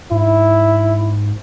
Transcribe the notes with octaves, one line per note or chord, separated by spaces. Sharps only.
G#2 E4